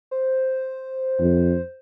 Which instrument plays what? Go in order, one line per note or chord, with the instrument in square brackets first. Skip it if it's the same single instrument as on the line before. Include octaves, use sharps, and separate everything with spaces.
[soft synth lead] C5
[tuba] F2